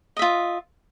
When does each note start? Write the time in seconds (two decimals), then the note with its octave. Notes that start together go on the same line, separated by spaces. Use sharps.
0.17 D#5
0.19 E5
0.22 F4